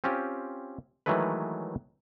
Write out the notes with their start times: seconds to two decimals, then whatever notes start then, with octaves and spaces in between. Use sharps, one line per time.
0.04 C4 C#4 F4 G4
1.06 D#3 E3 F#3 G#3 A3 B4